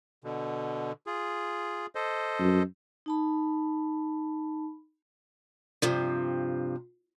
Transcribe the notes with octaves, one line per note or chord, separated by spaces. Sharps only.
B2 D3
F4 G#4
A4 C5 D#5
F#2
D#4 A5 B5
G2 C3 F3